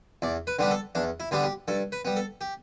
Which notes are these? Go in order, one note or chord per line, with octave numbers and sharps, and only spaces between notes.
E2 D5
B4
D3 G3 B3 D4
A4
E2 D4
E4
D3 G3 B3 D4
G4
G2 A4
B4
G3 B3
A4
G4